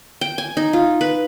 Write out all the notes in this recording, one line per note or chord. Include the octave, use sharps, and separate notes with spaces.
G5
G#5
D#4
F4
B4